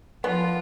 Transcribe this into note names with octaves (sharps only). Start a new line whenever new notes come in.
F3 B3 F4